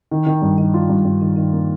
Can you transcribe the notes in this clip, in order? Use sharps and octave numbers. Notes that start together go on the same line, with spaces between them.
D#3
D#3
G2
D#3
F4
G2
G2
D#3
D#3
A#3